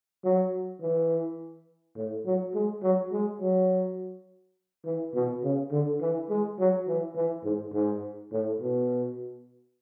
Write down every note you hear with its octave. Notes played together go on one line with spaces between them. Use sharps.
F#3
E3
A2
F#3
G#3
F#3
G#3
F#3
E3
B2
C#3
D3
E3
G#3
F#3
E3
E3
G#2
G#2
A2
B2